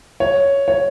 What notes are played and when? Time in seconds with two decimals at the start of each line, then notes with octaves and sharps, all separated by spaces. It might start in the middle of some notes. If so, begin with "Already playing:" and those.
0.20 C#5
0.68 C#5